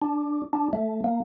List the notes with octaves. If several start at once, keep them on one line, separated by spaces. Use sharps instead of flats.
D4
D4
A3
A#3